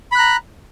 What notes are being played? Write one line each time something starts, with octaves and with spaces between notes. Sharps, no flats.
A#5 B5 F#6